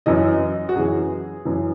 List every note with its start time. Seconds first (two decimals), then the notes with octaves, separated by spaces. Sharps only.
0.06 F#2 E3 D#5
0.69 F#4
0.75 F#2 E3 G#4
1.45 F#2 E3